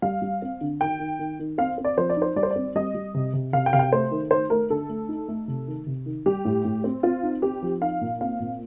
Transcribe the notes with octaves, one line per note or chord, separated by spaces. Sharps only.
G3 F5
G3
C4
D3
D#3 G5
D#3
D#3
D#3
C4 F5
C4
D5
F3 C5
D5
D#4
C5
G3 D5
C5
D5
C4
G3 D#5
G3
C3
C3
C3 F5
G5
C3 F5
G5
A3 C5
D#3
D#3 C5
A3 A#4
D3 A4
A3
D#4
A3
C3
D#3
C3
D#3
G3 G4
A2
A2
C4
C4 F4
D#4
C4 G4
F3
D#4 F5
A#2
C4 F5
A#2